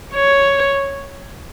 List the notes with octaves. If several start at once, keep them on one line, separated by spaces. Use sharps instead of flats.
C#5